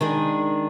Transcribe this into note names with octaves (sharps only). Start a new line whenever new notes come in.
D#3 G#3 D4 G#4